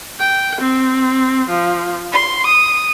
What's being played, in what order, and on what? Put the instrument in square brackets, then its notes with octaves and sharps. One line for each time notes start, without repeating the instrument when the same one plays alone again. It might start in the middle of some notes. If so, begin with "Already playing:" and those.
[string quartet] G5
C4
F3
C6
D#6